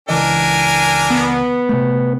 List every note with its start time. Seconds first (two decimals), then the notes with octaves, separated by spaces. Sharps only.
0.09 C#2 E3 D4 A#4 D#5 G#5
1.10 B3
1.69 C3 A3